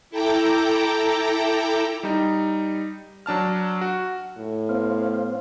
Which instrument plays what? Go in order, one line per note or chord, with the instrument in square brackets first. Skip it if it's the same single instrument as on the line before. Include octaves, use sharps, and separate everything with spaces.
[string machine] E4 A4 G5 A#5 D6
[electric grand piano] G3 D#4
F#3 D4 A5 F6
F#4
[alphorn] A2
[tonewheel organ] B3 C5 F5